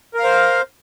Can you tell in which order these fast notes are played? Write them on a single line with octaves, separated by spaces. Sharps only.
A#4 F5 C5